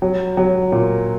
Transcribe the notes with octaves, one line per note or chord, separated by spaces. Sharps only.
F#3
F#3
A#2